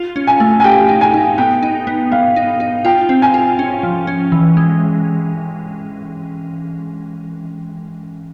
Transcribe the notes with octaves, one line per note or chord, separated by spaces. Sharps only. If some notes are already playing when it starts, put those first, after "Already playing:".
Already playing: F4
C#4
G#5
A3
G#5
G4 G5
D#4
G#5
D#4
B3 G5
D#4
B3
B3 F5
D#4
D#4
F4 G5
C4
G#5
F4
C#4
F3
C#4
E3
G#3